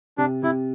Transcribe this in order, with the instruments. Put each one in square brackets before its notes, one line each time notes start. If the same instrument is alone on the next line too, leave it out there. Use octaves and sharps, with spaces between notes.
[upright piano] C3 [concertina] D4
[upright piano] C3 [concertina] E4